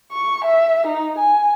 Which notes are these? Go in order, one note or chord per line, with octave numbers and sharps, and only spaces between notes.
C#6
E5
D#4
G#5